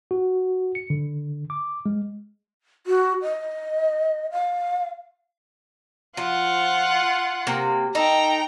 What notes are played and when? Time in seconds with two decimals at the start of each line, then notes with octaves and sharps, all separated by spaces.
0.11 F#4
0.75 C#7
0.90 D3
1.50 D6
1.86 G#3
2.87 F#4
3.22 D#5
4.32 F5
6.17 F3 F4 F#5
7.47 C3 A#3
7.95 D#4 A4 G5 A#5